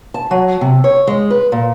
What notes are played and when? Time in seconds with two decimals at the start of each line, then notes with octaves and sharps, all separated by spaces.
0.14 A5
0.31 F#3
0.61 C3
0.84 C#5
1.07 G#3
1.30 B4
1.52 A#2